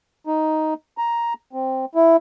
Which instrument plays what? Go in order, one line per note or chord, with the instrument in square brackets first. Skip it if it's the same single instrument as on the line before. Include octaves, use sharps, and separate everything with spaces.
[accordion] D#4
A#5
C4
E4